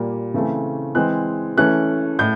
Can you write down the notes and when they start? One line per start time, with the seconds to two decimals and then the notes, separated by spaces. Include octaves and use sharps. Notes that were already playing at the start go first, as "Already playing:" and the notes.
Already playing: A#2 G3 A#3
0.34 C#3 E3 A3 C4
0.95 E3 G#3 C4 F#6
1.57 E3 A3 C#4 F#6
2.19 A2 G6